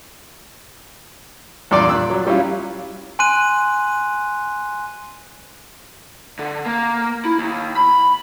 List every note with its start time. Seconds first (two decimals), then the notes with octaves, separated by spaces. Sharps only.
1.71 E2 G2 A#2 D5 C6 D6
1.88 A#2 E6 F#6
2.10 F#3
2.25 F#3 G3 C#4 E4 F4
3.19 G#5 C6 F#6 D#7
6.39 D3
6.66 A#3
7.25 E4
7.38 D#2
7.77 B5